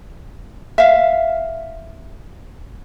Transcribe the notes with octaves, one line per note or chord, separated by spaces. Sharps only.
E5 F5